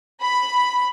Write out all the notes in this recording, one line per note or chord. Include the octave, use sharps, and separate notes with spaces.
B5